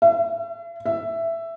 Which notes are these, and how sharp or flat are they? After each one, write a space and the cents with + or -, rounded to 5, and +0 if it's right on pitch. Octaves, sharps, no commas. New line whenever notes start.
E5 +45
E5 +10